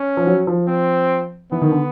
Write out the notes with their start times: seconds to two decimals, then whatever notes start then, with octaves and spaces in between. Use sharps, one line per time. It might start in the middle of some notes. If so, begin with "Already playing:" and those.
Already playing: C#4
0.17 F3
0.27 F#3
0.47 F3
0.68 C4
1.52 E3 B3
1.62 D#3
1.72 D3